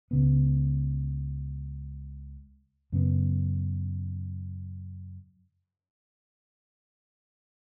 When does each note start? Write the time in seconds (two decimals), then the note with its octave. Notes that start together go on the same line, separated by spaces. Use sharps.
0.11 C#2 C#3 B3
2.92 F#2 C#3 B3